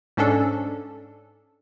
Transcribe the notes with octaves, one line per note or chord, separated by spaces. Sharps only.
G#2 C#4 D4 A4